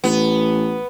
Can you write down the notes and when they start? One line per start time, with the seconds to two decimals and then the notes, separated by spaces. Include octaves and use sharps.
0.04 A1 B3